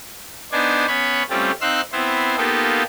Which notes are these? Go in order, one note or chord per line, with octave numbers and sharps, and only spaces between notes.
B3 D4 D#4 C5 D5 G#5
B3 C#4 C#5 B5 C#6
G3 A3 C4 C#4 F4 G4
C4 D#4 F5 C6 E6 F#6
B3 C4 E4 C5
A#3 B3 D#4 F4 G4 A4